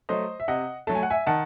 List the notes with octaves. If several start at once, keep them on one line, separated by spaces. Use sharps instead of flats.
F#3 A3 C5 D#5
E5
C3 D#5 F#5
F#3 A3 A5
G#5
F#5
E5 G#5
D#3 F#5 A5